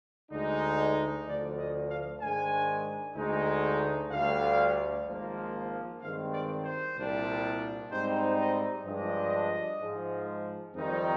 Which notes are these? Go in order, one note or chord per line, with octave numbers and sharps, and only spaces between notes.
D2 D3 G#3 D#4
D2 D3 F3 D5
D#5
F5
G#2 D#3 G#3 D4 G#5
D2 D3 G#3 D#4
D2 D3 G3 D4 F5
G#1 G#2 F3 A#3
G2 D#3 G#3 C4 F5
D5
C5
C2 A#2 G3 D4
G#2 G3 C4 D#4 C5
D#5
G2 F3 G#3 D4 D#5
G#2 F3 G#3
F2 D#3 G3 C4 D#4